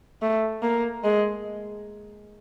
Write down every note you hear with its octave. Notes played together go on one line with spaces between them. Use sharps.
A3
A#3
G#3